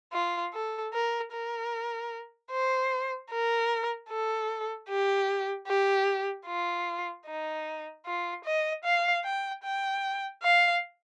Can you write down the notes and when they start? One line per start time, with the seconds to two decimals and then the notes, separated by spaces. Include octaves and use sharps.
0.13 F4
0.53 A4
0.93 A#4
1.32 A#4
2.52 C5
3.30 A#4
4.09 A4
4.89 G4
5.67 G4
6.47 F4
7.27 D#4
8.06 F4
8.45 D#5
8.84 F5
9.24 G5
9.63 G5
10.43 F5